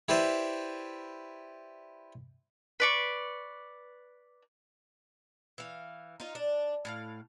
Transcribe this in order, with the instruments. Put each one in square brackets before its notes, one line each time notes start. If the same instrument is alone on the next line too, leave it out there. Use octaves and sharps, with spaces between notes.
[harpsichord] E4 G4 B4 C5 D5 E5
[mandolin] B4 D5 C#6
[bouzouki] E3 F5
D#4 F4
D4
A2 G4 F5